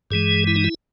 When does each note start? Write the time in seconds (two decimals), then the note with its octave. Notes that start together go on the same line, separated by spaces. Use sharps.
0.11 G2 E3 G#3 G#4
0.47 E4
0.56 D#4
0.64 E4